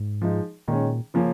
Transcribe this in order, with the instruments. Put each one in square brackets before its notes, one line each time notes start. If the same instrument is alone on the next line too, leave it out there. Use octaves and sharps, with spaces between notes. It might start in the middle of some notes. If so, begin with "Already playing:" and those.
Already playing: [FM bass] G#2
[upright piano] F3 G#3 D#4
[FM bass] A#2 [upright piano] D#3 G#3 C#4
[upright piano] C#3 F3 A#3 C#4